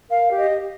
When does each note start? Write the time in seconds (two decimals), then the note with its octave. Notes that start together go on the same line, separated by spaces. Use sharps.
0.09 A#4 F5
0.29 G4
0.36 D#5
0.49 G4